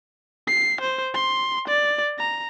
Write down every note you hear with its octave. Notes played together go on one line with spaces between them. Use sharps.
C7
C5
C6
D5
A#5